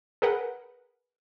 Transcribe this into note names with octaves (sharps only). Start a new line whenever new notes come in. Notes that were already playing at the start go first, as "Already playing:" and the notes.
G#4 A#4 B4 F#5